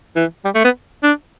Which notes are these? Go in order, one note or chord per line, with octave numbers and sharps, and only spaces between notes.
E3
G3
A3
B3
D4